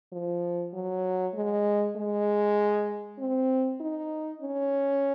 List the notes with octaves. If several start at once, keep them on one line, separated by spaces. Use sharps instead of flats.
F3
F#3
G#3
G#3
C4
D#4
C#4